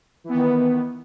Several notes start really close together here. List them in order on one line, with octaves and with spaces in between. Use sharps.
E3 B3 D#3